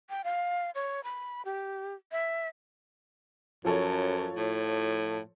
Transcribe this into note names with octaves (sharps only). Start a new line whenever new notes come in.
G5
F5
C#5
B5
G4
E5
F#2 F3 A4 C#5
A2